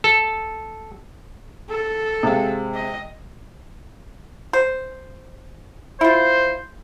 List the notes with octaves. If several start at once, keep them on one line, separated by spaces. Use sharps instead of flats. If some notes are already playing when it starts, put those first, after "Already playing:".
A4
A4
C3 G#3 F5
D#5
C5
E4 F4 C5